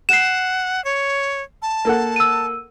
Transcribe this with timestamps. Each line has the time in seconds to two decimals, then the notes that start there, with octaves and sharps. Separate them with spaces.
0.09 F#5 C7 E7
0.84 C#5
1.62 A5
1.85 A#3 A4 F#5
2.16 E6 D#7